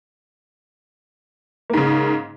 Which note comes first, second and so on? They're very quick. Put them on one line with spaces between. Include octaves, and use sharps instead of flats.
A#3 G#2 C#3